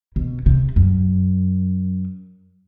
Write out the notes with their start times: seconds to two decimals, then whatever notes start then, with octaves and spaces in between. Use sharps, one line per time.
0.16 B2
0.46 C3
0.76 F#2